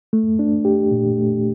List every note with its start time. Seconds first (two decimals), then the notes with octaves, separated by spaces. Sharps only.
0.13 A3
0.39 D4
0.65 G4
0.91 A#2
1.18 A3